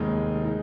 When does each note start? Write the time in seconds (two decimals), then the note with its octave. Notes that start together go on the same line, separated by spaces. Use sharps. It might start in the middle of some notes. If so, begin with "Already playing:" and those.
Already playing: F1 D#2 D#3 G#3 D#4
0.45 G#3 D#4